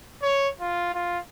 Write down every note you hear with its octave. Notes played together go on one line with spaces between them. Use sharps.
C#5
F4
F4